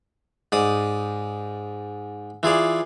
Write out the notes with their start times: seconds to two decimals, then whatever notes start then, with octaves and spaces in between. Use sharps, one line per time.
0.52 G#2 D5 D#6
2.43 E3 F4 G#4 D5